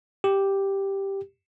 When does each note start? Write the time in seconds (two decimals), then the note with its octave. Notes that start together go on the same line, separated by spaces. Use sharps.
0.24 G4